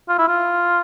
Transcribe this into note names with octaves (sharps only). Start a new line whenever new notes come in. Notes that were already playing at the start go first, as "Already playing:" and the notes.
F4
E4
F4